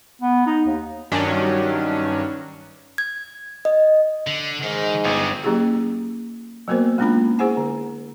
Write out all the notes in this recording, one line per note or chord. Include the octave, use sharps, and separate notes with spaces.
B3
D#4
D#2
G2 D#3 F#3 C#4 D4
G#6
D#5
D3
G#2 D#3
G1 D3 C#4
F#3 A#3 C#4 E4 G4 G#4
F#3 A#3 B3 F#4 A#4 C5
G#3 A#3 C#4 D4 F4 B5
E4 G#4 C5 F#5 G#5
D3